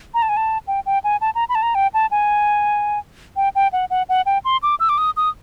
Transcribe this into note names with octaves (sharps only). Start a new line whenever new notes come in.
A#5
A5
G#5
A5
G5
G5
G#5
A5
A#5
B5
A5
A#5
G5
A5
G#5
G5
G5
F#5
F#5
F#5
G5
C6
D6
E6
D6
D#6
D#6